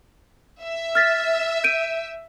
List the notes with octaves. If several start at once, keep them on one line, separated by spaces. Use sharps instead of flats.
E5
F6 A6 B6
G6 D7 D#7